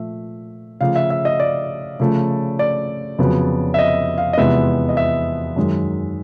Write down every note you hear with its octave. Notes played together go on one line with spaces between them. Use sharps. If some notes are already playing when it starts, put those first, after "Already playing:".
Already playing: A#2 F3 A3 E5
C#3 F3 A3 F5
E5
E5
D#5
D5
C#3 F3 A3
D5
F2 C#3 F#3 B3
E5
D#5
F5
D#5
E2 C3 F3 G#3 B3 E5
D#5
E5
F#2 D#3 G#3